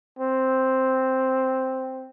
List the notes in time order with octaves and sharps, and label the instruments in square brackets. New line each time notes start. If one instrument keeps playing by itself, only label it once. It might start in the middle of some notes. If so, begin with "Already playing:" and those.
[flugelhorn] C4